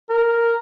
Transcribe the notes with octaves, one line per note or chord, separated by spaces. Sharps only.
A#4